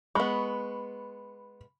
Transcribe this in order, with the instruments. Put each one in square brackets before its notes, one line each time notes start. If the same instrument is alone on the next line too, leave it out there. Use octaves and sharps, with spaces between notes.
[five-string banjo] G#3 B3 [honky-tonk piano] B5 C#6